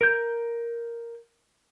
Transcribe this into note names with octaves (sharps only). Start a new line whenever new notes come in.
A#4 G6